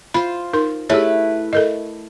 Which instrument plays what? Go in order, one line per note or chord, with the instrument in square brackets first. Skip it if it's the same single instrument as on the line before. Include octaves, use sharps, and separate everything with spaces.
[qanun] F4 C5 [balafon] B5
[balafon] D#4 A#4 C6
[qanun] A3 E4 B4 [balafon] G4 G#4 C#5
[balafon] A4 A#4 D#5